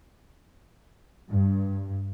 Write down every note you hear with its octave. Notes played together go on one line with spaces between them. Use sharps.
G2